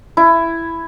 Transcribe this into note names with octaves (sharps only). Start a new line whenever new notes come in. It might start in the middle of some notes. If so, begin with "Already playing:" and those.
E4